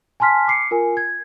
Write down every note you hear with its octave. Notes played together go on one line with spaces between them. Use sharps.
G#5 A5 C6 F6 B6
D6 C7 C#7
F4 A#4 G#5
G#6